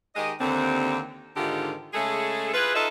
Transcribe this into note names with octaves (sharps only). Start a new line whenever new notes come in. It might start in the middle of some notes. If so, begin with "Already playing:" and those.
D#3 G#3 G4 D#5
D#2 D3 C4
G#2 D3 D#3 D#4 F4 G4
C#3 G#3 A3 G#4 A4
E4 F4 G#4 B4
D#4 F4 A4 B4 D#5 E5